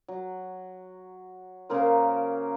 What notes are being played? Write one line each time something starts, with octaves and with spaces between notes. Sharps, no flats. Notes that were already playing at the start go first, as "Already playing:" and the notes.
F#3
C#3 A#3 A#4 C5